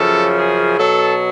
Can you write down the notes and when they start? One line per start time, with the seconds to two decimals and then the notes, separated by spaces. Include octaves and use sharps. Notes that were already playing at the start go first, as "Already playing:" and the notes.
Already playing: F#2 C#3 F3 A4
0.38 G#4
0.78 B2 F#3 A4